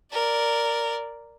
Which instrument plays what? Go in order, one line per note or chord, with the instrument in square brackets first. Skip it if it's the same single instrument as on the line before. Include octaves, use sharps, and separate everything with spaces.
[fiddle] A#4 D5